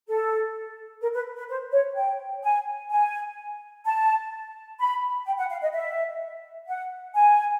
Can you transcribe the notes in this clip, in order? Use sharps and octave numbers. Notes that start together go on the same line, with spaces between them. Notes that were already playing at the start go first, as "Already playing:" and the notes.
A4
A#4
B4
B4
C5
C#5
G5
G#5
G#5
A5
B5
G5
F#5
F5
D#5
E5
F#5
G#5